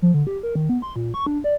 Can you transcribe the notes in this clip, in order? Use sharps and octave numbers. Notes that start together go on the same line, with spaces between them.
F3
D3
G4
A#4
D#3
B3
C6
A#2
C#6
D4
D5